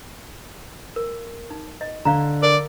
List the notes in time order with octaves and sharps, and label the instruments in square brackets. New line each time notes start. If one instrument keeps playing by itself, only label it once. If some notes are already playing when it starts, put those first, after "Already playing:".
[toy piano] A#4
D#4
D#5
[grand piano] D3 [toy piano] D5 F5 A#5
[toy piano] A#4 [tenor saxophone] D5